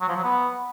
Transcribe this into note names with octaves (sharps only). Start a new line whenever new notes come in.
F#3
F3
F#3
B3